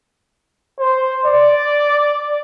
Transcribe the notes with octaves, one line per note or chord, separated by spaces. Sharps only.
C5
D5